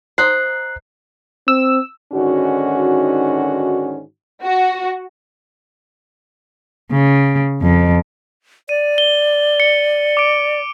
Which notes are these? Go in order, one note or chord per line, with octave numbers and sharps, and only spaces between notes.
D#4 C5 F#6 C7
C4 E6
G#2 D3 D#3 C#4 F#4
F#4
C#3
F2
D5 D#7
G7
C#7
D6 D7